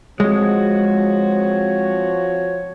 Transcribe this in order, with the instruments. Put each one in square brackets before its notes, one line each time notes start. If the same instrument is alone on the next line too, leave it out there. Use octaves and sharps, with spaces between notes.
[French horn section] F3 C4 F#4 [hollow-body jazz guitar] G#3 [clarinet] C#5